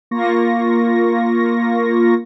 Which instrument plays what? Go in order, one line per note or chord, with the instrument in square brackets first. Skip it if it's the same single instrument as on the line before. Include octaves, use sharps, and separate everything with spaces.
[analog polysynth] A#3 F4 C#6 A#6